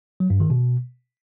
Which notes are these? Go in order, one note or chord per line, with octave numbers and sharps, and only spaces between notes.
F#3
G2
D#3
B2